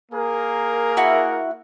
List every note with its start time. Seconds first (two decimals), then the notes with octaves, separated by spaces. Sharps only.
0.12 A#3 G#4 A#4
0.97 E4 F#4 F#5